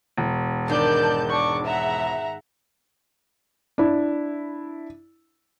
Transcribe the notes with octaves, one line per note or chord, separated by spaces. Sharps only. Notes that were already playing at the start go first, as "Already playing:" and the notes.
E1
G#2 D#3 D4 D5 A5 G6
D4 C#6 D6
E5 F#5 A#5
D4 E4